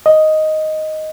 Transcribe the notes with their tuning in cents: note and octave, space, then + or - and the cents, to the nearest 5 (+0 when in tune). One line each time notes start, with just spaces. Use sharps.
D#5 +0